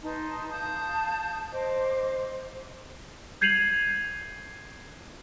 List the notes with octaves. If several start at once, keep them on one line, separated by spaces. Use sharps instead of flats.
D#4 B4 A5 C6
F5 A5 D#6 G6
C5 D#5 D6
G6 G#6 C7 D#7 F7 F#7